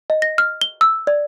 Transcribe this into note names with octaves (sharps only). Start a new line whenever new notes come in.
D#5
A#6
F6
G7
E6
D5